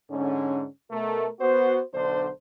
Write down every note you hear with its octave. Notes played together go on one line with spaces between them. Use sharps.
G#2 D3 C#4
B2 A3 A#4
B3 F#4 C5
B1 D3 D4 C5